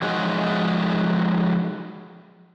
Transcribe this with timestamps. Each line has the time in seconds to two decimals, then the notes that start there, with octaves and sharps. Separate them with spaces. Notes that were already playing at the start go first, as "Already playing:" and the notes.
0.02 F3 F#3 G#3 D#4 F#4 G#4